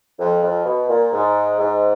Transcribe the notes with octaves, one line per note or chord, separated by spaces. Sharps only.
F2
F2
B2
A#2
G#2
G#2